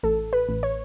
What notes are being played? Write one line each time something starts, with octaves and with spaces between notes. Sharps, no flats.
A1 A4
B4
A1
C#5